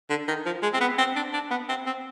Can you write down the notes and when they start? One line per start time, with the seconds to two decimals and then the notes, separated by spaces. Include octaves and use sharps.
0.10 D3
0.28 D#3
0.46 F3
0.63 G#3
0.74 C4
0.80 B3
0.98 C4
1.16 D4
1.33 D4
1.51 B3
1.69 C4
1.86 C4